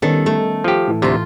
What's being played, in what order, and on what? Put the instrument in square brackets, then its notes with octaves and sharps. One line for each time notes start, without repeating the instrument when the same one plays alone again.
[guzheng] D#3 A4 [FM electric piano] G3 B3 C#4
[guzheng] A3
[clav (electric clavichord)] F3 G4
[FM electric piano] A2 E3
[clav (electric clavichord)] D2 C3 [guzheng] F4 G5